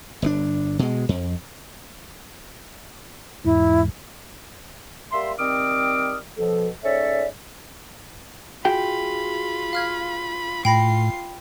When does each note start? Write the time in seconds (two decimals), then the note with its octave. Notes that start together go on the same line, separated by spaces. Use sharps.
0.22 G1 C#3 D4
0.79 B2 G#3
1.09 F2
3.45 E2 G#2 E4
5.12 G3 A#3 E5 C6
5.39 D#3 G3 C4 D6 D#6 F6
6.38 B2 F3 A4
6.84 G#2 C#4 A4 C#5 D5 E5
8.65 F4 F#4 G#4 G5 B5
9.73 F5 F6 G#6
10.65 A2 F4 G5 B5 A#6 C7